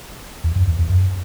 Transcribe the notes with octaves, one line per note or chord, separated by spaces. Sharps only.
E2
F#2
E2
E2
F#2